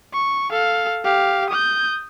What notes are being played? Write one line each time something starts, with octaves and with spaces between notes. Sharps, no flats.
C#6
A4 F5
G4 F5
D#6 G6